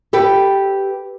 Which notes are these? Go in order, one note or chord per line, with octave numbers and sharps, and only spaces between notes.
G4 A4 B4 G5